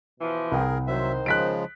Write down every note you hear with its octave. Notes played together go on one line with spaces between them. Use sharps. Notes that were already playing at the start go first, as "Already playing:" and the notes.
B2 E3 F3
C2 G#4 A#4 G5
D#3 F#3 C5 E5
C#3 F3 G#3 F#6 B6 D7